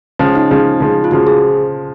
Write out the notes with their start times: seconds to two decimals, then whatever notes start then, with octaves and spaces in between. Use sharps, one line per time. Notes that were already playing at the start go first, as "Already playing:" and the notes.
0.19 C#3 F3 G#3 C#4
0.35 D#4
0.50 C#3 F3 G#3
0.80 C#3 F3 G#3
1.04 F4
1.11 C#3 F3 G#3 F#4
1.27 G#4